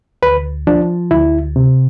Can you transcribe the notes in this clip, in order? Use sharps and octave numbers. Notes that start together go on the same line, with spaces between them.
D2 B4
F3 D4
D2 E4
C3